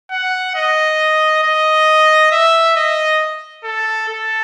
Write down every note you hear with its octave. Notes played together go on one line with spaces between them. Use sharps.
F#5
D#5
D#5
E5
D#5
A4
A4